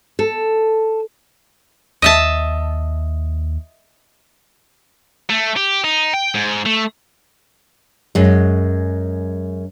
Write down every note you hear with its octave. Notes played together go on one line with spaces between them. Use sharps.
A4
D#2 D#5 E5 A5
A3
G4
D#4
G5
G#2
A3
F#2 G#3